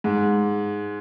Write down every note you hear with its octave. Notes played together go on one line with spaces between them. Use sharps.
G#2